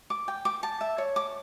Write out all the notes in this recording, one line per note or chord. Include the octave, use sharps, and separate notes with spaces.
D6
G5
D6
A5
E5
C#5
D6